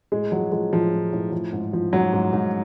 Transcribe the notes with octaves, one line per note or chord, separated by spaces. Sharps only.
A2 G#3
F3 F#3
F3 G#3
A2 F3
A2
A2
F3
G#2
F3
G#2 F#3
G#2
G#2